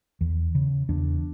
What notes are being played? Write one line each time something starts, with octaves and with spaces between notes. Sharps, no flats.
E2
C#3
E2 D4